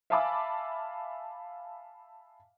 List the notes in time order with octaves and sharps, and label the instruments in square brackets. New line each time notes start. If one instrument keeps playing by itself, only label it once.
[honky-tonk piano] E5 F5 G#5 A5 B5 D6